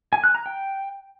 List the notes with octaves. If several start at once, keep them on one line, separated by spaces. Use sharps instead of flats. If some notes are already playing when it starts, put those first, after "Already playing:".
G#5
F#6
A#5
G5